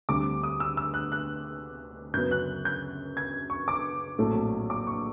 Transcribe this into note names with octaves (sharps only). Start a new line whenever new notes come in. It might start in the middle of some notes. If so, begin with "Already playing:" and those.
D2 D3 G3 C4 D6
D#6
E6
E6
F#6
F#6
F#2 C#3 F#3 B3 G6
F#6
G6
G#6
C#6
D6
A#1 A2 F#3 A3 C4
D6
C#6